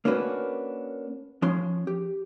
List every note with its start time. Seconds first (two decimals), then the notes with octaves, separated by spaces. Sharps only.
0.05 A#3 C#4 D4 F#4 B4
1.42 F3 C#4 C6
1.87 G4